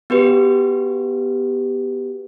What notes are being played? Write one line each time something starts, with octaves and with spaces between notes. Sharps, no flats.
B3 F#4 G4 B4